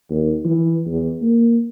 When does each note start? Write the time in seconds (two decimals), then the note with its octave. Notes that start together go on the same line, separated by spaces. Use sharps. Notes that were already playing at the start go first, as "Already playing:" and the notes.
0.10 D#2
0.45 E3
0.86 E2
1.22 A#3